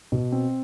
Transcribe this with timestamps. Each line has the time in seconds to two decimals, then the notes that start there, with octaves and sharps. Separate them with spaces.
0.12 B2
0.32 C4